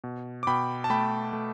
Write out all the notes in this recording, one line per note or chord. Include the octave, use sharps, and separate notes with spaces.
B2
D6
B2 G5 B5
A5
A3 G5 B5
A3